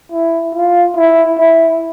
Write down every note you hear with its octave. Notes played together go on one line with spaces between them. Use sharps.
E4
F4
E4
E4